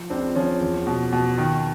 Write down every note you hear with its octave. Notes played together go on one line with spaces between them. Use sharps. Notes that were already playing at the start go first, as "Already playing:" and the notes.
Already playing: F3
C#2 C4 D4
F3 C#4
E2
B2
B2
D#3